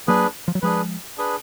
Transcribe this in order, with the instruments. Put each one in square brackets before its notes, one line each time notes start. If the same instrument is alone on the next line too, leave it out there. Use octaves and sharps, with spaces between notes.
[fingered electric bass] F#3 A#3 [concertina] D4 G#4 B4
[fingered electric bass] F3
F#3
[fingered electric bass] F3 G#3 [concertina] D4 G#4 B4
[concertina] D4 G#4 B4